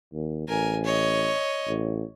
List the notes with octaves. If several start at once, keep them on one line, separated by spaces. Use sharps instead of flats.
D#2
A1 A#4 G#5
C#5 D#5
A1